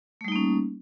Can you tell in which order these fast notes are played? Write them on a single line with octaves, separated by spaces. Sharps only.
A3 G3 D#4 A#3 C#4